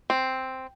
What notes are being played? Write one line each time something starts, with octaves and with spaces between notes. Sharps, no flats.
C4